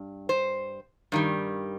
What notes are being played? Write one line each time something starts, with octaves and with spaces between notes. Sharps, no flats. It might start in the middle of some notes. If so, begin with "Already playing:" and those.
Already playing: G2
C5
G2 D#3 G3